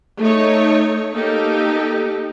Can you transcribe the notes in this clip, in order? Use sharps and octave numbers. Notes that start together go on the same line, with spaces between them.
A3 D#4 C#5
A#3 D#4 G4 A4